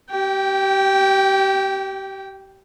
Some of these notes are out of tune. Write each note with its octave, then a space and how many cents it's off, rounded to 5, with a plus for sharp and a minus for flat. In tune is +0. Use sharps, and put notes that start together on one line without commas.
G4 -30 G5 +0